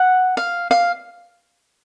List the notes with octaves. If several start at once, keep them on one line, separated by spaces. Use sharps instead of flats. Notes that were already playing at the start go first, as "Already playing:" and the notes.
Already playing: F#5
F5
F5